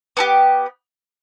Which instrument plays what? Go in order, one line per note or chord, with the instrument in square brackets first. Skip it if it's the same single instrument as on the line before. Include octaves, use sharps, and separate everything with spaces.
[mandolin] B3 D4 G4